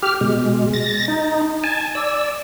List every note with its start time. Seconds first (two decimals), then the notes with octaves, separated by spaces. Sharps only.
0.03 G4 F6
0.21 B2 G#3
0.73 A6 A#6
1.08 D#4
1.64 G#5 A5
1.95 D5 E6